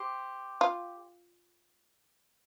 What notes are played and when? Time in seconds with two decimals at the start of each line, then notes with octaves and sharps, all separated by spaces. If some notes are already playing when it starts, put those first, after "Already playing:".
Already playing: G4 C5
0.61 F4